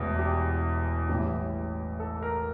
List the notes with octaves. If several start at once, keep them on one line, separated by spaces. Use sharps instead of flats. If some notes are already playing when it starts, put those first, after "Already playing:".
Already playing: E1 E2 E3 A3
G4
A1 A2 E3 G3
A4
A#4